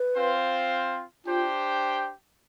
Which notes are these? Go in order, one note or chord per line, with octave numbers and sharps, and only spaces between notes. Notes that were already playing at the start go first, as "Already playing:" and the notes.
Already playing: B4
C4 F4 C5 F5
D4 F4 G4 C5 G5